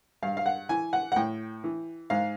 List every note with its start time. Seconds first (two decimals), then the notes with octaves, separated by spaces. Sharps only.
0.23 G2 F5
0.37 F5
0.46 F#5
0.69 E3 G#5
0.93 F#5
1.12 F#5
1.16 A2 G5
1.64 E3
2.10 G#2 F5